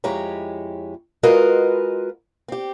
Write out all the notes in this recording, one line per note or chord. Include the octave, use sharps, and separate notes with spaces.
F2 G#3 E4 G4 C#5 A#5
G#3 F4 F#4 A#4 B4 D#5
C4 G4